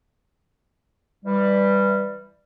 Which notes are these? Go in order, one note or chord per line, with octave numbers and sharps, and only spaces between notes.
E3 G3